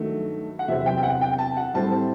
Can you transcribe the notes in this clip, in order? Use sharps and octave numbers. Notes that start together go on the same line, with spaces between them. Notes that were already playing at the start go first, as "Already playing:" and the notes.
Already playing: G2 D#3 F#3 A3
F#5
E2 C3 F#3 C4 E5
G5
G5
F#5
G5
A5
F#5
A2 G3 C4 E4 A5